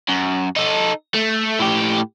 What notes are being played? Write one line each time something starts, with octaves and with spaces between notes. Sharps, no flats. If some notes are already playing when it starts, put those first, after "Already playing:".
F#2
D#4 A4
A3
A2 G4